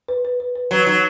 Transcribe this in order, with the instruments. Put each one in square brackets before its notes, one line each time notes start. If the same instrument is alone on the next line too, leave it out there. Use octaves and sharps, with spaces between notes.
[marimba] B4
B4
B4
B4
[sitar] F#3 [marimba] B4
[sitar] F#3 [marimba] D#4